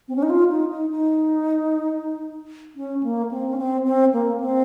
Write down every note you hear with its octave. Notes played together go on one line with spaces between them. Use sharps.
C4
C#4
D#4
F4
D#4
D#4
D#4
C#4
A#3
C4
C#4
C4
C4
A#3
C4